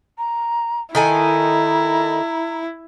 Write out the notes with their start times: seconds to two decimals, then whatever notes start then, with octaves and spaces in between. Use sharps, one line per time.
0.18 A#5
0.95 D#3 E4 A4 G#5 A#5